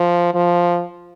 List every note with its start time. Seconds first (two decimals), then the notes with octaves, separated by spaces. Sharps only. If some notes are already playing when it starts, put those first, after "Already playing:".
Already playing: F3
0.35 F3